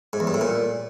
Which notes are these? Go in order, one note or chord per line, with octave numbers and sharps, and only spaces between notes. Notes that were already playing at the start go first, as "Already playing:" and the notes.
G#2
E2
G2
A2
A#2